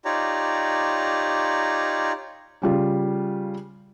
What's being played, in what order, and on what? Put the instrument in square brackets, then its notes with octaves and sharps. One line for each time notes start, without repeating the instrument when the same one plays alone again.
[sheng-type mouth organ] D#4 F4 G4 C#5 D5 A#5
[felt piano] C#3 G3 F4